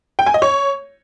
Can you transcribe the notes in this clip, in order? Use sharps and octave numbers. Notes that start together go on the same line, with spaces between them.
G5
G#5
D#5
C#5